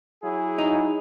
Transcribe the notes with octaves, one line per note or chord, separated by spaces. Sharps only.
F#3 E4 G#4
D#4